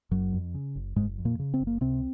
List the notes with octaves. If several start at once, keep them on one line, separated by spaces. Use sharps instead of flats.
F#1 F#2 F#3
F2
C#3
F#1
F#1 G#2 G#3
F2
A#2 A#3
C#3
C4
F#1
A#3
C#2 C3 C4